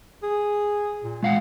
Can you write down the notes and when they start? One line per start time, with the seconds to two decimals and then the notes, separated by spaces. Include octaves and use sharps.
0.23 G#4
1.03 A#2
1.23 A#2 G#3 F5 F#5